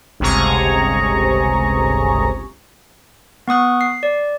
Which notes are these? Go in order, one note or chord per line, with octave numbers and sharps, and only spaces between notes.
G1 C#2 C3 G#4 A#5 C#6
B3 C#6 D#6 F#6
C7
D5